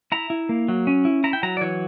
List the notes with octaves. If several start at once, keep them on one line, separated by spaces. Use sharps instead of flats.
E4 A#5
E4
A#3
F#3
C#4
E4
E4 A#5
G5
F#3 A#5
D5
E3 C#5